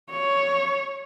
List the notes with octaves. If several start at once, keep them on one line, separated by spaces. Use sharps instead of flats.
C#5